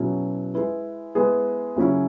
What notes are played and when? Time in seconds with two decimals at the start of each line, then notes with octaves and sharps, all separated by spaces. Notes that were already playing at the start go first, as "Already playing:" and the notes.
Already playing: B2 F#3 C#4 E4 G#4
0.54 G#3 E4 B4
1.15 G#3 B3 E4 G#4 B4
1.77 C#3 F#3 C#4 E4